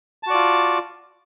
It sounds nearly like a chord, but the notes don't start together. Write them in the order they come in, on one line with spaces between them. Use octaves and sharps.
A5 F#4 D5 F4